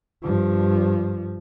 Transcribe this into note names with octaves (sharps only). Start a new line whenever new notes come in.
G2 F3